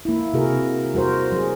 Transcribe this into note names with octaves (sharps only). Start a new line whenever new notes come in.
A#3 E4
C3 F#4 G#4 A#4
G3 F#4 A#4 C5
F#3 G#4